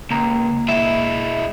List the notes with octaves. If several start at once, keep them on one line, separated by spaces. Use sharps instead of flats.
C#2 A#3 A#5
G#3 E4 E5